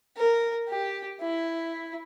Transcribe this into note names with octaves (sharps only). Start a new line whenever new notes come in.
A#4
G4
E4